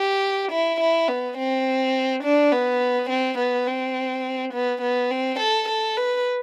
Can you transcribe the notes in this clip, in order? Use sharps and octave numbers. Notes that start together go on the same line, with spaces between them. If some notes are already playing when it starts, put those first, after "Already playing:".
Already playing: G4
E4
E4
B3
C4
D4
B3
C4
B3
C4
B3
B3
C4
A4
A4
B4